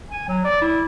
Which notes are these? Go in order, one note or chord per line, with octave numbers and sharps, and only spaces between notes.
G#5
F#3
D5
E4